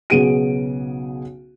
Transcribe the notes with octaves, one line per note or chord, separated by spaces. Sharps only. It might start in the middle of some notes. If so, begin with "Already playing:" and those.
B1 C#3 B3 G#4 D7 D#7